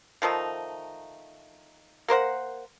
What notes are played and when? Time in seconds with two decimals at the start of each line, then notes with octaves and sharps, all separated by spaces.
0.22 D#3 F3 A3 D#4
2.08 A#3 A#4 C5 F#5